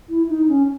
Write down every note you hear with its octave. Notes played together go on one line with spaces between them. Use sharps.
E4
D#4
C#4